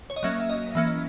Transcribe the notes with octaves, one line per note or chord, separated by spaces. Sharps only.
C#5
D#5
F#3 A#3 C#4 E5
E5
D#5
E3 A#3 C#4 E5